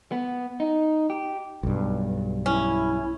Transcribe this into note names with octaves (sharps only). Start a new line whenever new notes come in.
B3
D#4
G4
B1 G2
C#4 E4